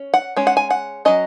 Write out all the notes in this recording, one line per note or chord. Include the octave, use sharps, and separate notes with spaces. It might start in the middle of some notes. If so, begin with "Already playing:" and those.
Already playing: C#4
F#5
G#3 C#4
F#5
G#5
F#5
F#3 C#4 D#5